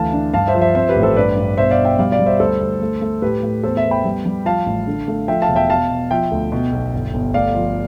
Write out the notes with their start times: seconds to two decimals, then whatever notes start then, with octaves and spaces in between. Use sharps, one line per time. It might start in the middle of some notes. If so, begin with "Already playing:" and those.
Already playing: D2 E3 F5 A5
0.13 D4
0.34 G2 F5 A5
0.47 C5 E5
0.55 F3
0.61 C5 E5
0.75 C4 C5 E5
0.89 G4 B4
0.96 A1
1.02 A4 C5
1.16 G2 B4 D5
1.37 G2
1.57 B2 C5 E5
1.71 D5 F5
1.78 B2
1.85 E5 G5
1.99 G3 D5 F5
2.12 D5 F5
2.19 G3
2.26 C5 E5
2.40 D2 A4 C5
2.61 D2
2.81 A3
3.01 A3
3.22 A2 G4 B4
3.43 A2
3.63 E2 A4 C5
3.77 C5 E5
3.84 B3
3.91 G5 B5
4.05 G3
4.26 G3
4.45 F3 F5 A5
4.66 A1
4.87 D3
5.08 A3
5.28 F3 E5 G5
5.42 F5 A5
5.49 E1
5.56 E5 G5
5.70 B2 F5 A5
5.90 B2
6.11 F3 E5 G5
6.31 D2
6.52 B2
6.72 B1
6.93 G1
7.14 G1
7.34 A3 D5 F5
7.55 F3